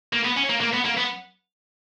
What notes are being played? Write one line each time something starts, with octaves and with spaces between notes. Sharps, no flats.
A#3
B3
C#4
A#3
A#3
B3
A#3
B3